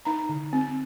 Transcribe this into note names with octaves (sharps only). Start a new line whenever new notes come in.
D#4 A#5
D3
C4